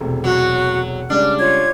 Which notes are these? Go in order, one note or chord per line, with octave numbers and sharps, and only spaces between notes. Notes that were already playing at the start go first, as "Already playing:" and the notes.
E1 C3 A3
F#3 F#4
C#3 G3 G#3 D4 F6
F4 C#5 G#6